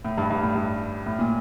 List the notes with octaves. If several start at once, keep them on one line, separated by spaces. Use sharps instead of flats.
A2
G2
G2
A2
G2
A2
A#2